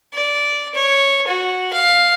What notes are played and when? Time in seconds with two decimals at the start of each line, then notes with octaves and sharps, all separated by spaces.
0.14 D5
0.74 C#5
1.27 F#4
1.73 F5